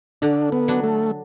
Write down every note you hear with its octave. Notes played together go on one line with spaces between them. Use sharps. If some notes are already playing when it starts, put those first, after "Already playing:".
D3 D4
B3
F#3 D4
A3